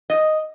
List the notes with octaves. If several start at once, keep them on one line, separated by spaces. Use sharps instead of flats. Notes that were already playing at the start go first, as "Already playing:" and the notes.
D#5